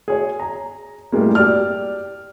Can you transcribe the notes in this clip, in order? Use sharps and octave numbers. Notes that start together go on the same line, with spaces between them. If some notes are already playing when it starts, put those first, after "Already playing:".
G#4 C#5
A#5
A2 G3 G#3 A#3
G4 D5 F6